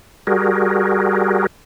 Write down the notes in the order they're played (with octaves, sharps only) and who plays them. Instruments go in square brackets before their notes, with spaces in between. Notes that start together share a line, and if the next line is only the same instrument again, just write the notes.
[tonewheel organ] G3 F#4 G#4 A#4